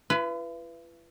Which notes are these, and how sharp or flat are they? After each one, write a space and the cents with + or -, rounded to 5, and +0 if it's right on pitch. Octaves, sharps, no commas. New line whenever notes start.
E4 +45 B4 +5